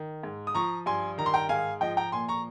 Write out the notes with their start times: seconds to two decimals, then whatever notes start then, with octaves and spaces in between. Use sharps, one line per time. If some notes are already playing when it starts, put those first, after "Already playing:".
Already playing: D#3
0.23 G#2
0.47 D#6
0.55 F3 A#5 C#6
0.86 G2 G#5 C6
1.18 D#3 A#5
1.26 C6
1.34 G5 A#5
1.49 G#2 F5 G#5
1.81 F3 D#5 G5
1.97 G5 A#5
2.12 A#2 G#5 C6
2.28 A#5 C#6